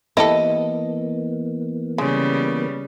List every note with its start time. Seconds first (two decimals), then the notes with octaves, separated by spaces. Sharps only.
0.17 E3 A#3 B3 E4 G4 A4 D#5
1.98 C#3 G3 G#3